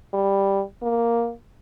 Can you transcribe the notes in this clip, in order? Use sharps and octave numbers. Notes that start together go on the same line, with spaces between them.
G3
A#3